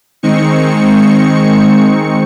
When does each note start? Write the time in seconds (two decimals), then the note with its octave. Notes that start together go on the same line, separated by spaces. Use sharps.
0.23 D#3 G#3 C4 D#4 C#6 C#7